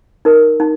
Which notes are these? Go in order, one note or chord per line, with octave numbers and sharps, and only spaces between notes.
D#4 A#4
D#4